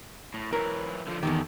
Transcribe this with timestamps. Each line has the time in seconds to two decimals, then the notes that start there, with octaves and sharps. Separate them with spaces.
0.34 A2
0.53 E3 F#3 A#4
1.07 D3 F3
1.23 E2 G#2 D#3 G4 A4